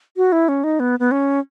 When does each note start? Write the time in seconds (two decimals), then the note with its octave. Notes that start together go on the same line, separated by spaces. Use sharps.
0.17 F#4
0.32 E4
0.49 C#4
0.64 D#4
0.80 B3
1.00 B3
1.11 C#4